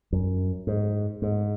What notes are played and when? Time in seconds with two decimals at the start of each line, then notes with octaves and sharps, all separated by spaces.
0.12 F#2
0.67 G#2
1.22 G#2